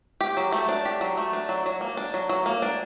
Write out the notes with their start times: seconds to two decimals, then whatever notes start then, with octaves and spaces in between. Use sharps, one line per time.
0.21 G4
0.37 F#3
0.52 A3
0.69 D4
0.85 G4
1.01 F#3
1.17 A3
1.33 D4
1.49 F#3
1.66 F#3
1.81 A#3
1.97 D4
2.14 F#3
2.29 F#3
2.46 A#3
2.62 D4